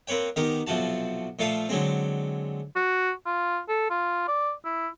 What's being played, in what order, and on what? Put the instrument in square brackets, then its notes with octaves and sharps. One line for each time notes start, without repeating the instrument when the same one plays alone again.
[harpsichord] A#3 C4 B4 C#5 G5
D#3 B3 G4 A#4
B1 C3 F3 F#4 A5
A#2 F3 A3 A4 F5
D3 F#3 G#3 C4
[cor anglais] F#4
F4
A4
F4
D5
E4